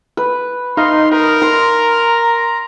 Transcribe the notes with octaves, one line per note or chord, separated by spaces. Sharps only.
B4
D#4 F5 C6
A#4 B5
A#5 C6